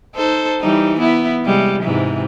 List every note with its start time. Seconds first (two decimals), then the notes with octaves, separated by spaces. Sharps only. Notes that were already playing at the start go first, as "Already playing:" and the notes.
0.16 D#4 A4 C5
0.61 E3 G3 D#4
0.99 B3 E4
1.44 C3 G3 G#3
1.83 G#2 C3 E3